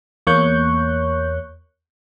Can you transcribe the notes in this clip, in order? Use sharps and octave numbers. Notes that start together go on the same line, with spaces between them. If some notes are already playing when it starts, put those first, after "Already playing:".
E2 A#3 C#5 C#6 F#6 G6